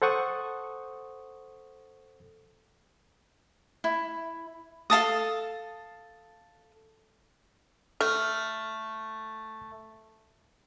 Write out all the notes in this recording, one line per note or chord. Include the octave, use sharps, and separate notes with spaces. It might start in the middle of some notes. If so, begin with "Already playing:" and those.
A4 C5 F#5 C#6 D#6
E4
A4 F5 A5 D#6
A3 F6